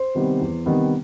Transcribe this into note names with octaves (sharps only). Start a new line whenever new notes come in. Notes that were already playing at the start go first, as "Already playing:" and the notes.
Already playing: C5
C3 D#3 G3 B3
E2
C3 D#3 G3 B3